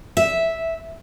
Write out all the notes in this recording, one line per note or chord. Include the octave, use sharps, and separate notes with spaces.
E5